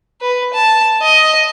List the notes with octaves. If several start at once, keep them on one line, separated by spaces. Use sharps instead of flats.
B4
A5
D#5